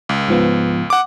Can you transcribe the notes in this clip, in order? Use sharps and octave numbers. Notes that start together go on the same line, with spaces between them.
C#2
G#2 F3 B3
F#5 D6